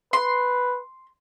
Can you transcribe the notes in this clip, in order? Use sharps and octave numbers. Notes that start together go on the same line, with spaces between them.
B4 C6